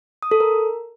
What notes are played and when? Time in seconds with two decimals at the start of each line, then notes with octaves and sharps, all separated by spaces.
0.23 D#6
0.31 A4
0.40 A#4